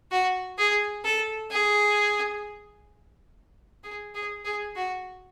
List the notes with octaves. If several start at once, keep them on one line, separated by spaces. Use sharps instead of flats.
F#4
G#4
A4
G#4
G#4
G#4
G#4
F#4